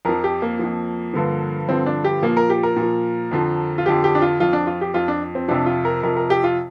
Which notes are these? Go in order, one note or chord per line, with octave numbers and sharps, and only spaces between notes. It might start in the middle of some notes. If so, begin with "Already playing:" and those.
F2 F3 A#4
G4
A#3
F2 F3
G2 D3 F3
G2 D3 F3 C4
D4
G4
A#2 F3 A#3
A#4
G4
A#4
A#2 F3
F2 D3 F3
F4
F2 D3 F3 G4
G4
D4
F4
F2 F3 F4
D4
F4
G4
F2 F3 F4
D4
C4
F2 C3 F3 D4
F4
A#4
F2 C3 F3 A#4
A#4
G4
F4